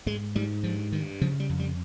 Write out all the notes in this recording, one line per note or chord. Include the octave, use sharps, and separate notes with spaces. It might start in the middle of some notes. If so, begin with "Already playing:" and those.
G#2 G#3
G#2 G3
G2 F3
G2 D#3
C#3 F3
G3
F2
G3